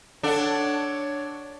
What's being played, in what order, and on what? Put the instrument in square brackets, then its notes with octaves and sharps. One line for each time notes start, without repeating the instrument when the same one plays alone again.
[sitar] D4 [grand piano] A4 F#5 A5 [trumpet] C#5